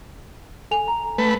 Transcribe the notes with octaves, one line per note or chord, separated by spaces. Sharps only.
A4 G#5 F7
A#5
A3 B4